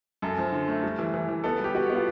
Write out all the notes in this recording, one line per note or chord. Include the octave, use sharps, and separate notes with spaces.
F#2 A4
F3
D3
A3
G3
E3
E3
E3
B3 A4
G3 G4
B3 F#4
B3
F4